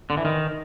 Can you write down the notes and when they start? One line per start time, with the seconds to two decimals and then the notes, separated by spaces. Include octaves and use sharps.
0.10 D3
0.17 E3
0.25 D#3